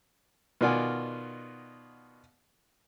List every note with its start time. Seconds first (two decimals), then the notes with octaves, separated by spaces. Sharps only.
0.61 B2 D#3 F4 D5 F#5 G#5